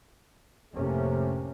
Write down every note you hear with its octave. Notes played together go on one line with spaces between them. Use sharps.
F1 A2 C3 A3 A#3 C#4